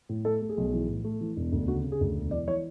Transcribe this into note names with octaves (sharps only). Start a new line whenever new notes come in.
A2
A3 A4
A3
G#4
B1
E3
A2
A3
E3
E1
D2
C#3 F#4
C#3
G#4
D2
E1
E3 D5
E3 C#5